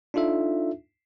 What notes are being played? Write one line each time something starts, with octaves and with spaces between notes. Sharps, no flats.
D4 D#4 F4 A4 E5